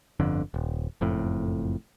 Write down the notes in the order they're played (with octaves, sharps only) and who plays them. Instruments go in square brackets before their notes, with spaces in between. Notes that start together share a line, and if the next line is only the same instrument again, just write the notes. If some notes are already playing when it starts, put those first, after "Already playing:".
[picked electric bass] G1 F2 D3
D#1
F#1 F2 A2